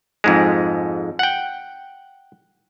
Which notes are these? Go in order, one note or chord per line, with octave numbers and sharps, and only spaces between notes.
F2 G#2 G#3
F#5 G5